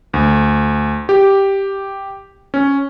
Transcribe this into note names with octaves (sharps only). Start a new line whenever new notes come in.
D2
G4
C#4